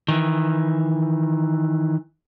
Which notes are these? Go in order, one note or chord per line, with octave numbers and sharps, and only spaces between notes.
D#3 E3